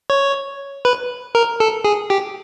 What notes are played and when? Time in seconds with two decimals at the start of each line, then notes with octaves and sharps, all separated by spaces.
0.10 C#5
0.85 B4
1.35 A#4
1.60 A4
1.85 G#4
2.10 G4